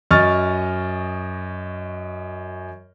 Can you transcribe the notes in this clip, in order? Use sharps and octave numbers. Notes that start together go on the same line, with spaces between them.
F#2 D#5 C#6 F6 A6